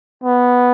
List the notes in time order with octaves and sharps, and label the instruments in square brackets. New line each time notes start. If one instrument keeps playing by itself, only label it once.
[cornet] B3